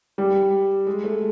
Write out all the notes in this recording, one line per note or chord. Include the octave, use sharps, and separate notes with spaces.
G3
G#3
A3